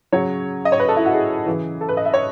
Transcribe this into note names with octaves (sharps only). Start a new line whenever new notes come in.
C#3 F#3 C#5
D#5
C#5
B4
A4
E4
F#4
G#4
C#3 E3
A4
B4
D#5
E5
C#5